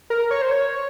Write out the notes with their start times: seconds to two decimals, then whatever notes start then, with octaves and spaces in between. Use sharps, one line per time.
0.10 A#4
0.31 C#5
0.42 C5
0.51 C#5